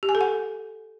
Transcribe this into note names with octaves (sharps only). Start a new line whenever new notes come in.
G4
G#5
A4
F#5